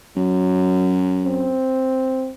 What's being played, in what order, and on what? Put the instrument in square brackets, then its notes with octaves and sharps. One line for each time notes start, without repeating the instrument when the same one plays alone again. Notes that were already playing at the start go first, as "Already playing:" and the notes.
[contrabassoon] F#2 [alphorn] F#3
[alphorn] C4